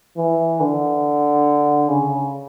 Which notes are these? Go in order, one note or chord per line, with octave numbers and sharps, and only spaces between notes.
E3
D3
C#3